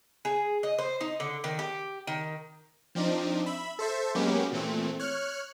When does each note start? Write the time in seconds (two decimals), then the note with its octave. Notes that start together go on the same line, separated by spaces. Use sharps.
0.25 G#4
0.63 D#5
0.78 C5
1.01 D#4
1.20 D3
1.44 D#3
1.59 G4
2.07 D#3
2.95 F3 C4 D4 D#4
3.46 E5 B5
3.79 A4 C5 E5
4.15 F#3 G#3 A#3 B3 C#4 G4
4.52 A#2 E3 A3 C4
4.99 C#5 F6 F#6